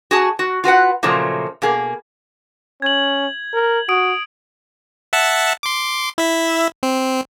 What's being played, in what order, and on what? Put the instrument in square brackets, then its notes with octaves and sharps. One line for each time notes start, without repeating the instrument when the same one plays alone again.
[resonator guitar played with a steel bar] F#4 G#4 A5
F#4
F4 F#4 B4 F#5
A#2 C#3 F3 F#3 A3 A#3
B2 A#3 G#4
[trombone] C#4 [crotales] G#6 F#7
[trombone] A#4
[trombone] F#4 [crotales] D#6 D7
[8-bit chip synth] E5 F#5 A5
C6 D6
E4 E5
C4